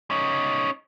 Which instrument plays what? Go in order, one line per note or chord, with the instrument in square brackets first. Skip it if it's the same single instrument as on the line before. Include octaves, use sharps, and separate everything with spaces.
[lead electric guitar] C#4 D#4